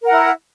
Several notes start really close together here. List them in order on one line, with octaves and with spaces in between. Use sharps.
A#4 F#5 E4